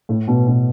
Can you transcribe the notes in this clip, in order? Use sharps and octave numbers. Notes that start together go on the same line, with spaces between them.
A2
B2
B2